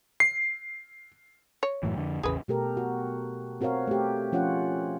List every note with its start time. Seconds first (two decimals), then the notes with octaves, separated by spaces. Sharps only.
0.20 C7
1.63 C#5
1.83 F#2 A2 E3
1.97 F2 D3
2.23 A1 E2 C#3 G#4 B4
2.48 B2 A3 G4 A4 A#4
2.77 F#4
3.61 C4 F#4 A#4 C#5 F5
3.87 A3 G4
4.32 F3 C#4 F4 C#5 F#5